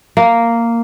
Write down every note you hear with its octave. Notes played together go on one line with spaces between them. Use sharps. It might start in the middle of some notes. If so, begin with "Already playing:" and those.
A#3